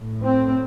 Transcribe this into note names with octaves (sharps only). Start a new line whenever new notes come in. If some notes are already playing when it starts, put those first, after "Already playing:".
Already playing: A2
C4